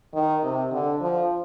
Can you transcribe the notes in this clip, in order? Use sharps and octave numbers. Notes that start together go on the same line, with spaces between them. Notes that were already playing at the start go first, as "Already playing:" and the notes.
D#3
C3
D3
F3